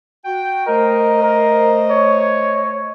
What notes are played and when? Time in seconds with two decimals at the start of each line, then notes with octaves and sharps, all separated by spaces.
0.25 F#4 G5
0.67 A3 A#4 C5 D#5
1.22 A#4
1.90 C#5